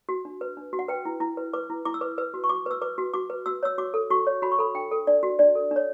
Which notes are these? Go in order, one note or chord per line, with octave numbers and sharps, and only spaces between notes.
F#4
D4
B4
D4
F#4
F#5
B4 G5
E4
E4
B4
B4 D6
E4
E4 D6
E6
B4 D6
B4 E6
F#4
C#6
F#4 D6
B4 E6
B4 D6
F#4
F#4 D6
B4
F#4 E6
C#5 E6
F#4 D6
A4
F#4 C#6
C#5
F#4 B5
C#6
A4 B5
D4 G5
A4
D4 D5
F#4
D4 D5
A4
D4
C#5